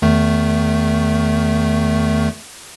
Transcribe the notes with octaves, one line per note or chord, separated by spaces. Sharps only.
E2 D#3 A3